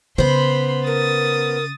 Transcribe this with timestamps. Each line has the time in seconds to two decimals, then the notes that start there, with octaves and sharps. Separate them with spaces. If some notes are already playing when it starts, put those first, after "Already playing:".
0.18 C#3 B3 C5 B5 C6
0.87 A#4 D#6 A6